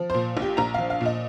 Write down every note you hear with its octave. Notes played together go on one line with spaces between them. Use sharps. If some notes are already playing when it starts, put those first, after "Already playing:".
Already playing: F3
A#2 C5
A#1
G4
A#1 A#5
F3 F5
F5
A#2 D#5